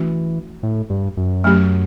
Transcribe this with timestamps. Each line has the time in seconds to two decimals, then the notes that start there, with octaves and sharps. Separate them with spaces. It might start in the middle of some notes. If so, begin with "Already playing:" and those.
Already playing: E3 A3 C#4 F#4
0.63 A2
0.90 G2
1.17 F#2
1.44 F#3 A3 C#4 G4